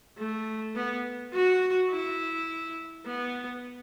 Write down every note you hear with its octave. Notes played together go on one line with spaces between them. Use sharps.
A3
B3
F#4
E4
B3